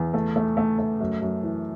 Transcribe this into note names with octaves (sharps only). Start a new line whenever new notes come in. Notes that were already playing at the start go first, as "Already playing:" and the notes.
Already playing: E2
A3
A3
A3
A3
F#2
F#2
E3